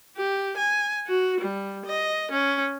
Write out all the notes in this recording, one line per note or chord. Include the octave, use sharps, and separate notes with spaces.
G4
G#5
F#4
G3
D#5
C#4